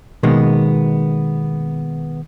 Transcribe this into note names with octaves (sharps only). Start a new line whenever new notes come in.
B2 D#3 G#3 A#3 B3